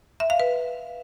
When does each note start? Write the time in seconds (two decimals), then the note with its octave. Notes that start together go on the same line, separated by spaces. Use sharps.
0.20 E5
0.30 F5
0.40 B4